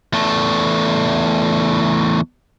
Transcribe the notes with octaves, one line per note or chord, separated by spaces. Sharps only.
E2 A3